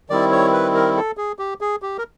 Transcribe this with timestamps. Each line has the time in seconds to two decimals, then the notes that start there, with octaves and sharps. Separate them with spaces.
0.10 D#3 G3 C4 E4 D5
0.32 C#5
0.53 B4
0.75 A#4
0.96 A4
1.17 G#4
1.39 G4
1.61 G#4
1.82 G4
1.98 A#4